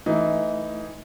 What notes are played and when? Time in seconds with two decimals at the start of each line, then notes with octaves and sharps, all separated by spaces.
0.06 E3 A3 D#4 E4 E5